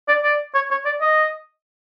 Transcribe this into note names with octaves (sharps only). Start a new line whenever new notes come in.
D5
D5
C#5
C#5
D5
D#5